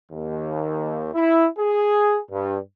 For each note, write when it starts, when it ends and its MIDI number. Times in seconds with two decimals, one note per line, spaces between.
0.12 1.09 39
1.14 1.46 64
1.59 2.18 68
2.31 2.57 43